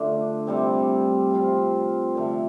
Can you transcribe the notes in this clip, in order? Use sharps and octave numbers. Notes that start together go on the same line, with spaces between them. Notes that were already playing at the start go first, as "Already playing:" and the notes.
Already playing: D3 A3 D4 F4
C3 G3 C4
F3 C4 F4
D3 F3 A3